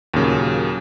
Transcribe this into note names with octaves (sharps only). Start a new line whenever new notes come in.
D#2 A#2 C#3 F#3